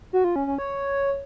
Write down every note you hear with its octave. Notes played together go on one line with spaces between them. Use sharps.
F#4
F4
C#4
C#4
C#5